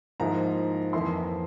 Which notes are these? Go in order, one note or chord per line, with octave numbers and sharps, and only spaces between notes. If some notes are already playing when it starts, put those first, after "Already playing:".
G#2 F3 A#3 E4 A#5
F2 E3 A#3 E4 C6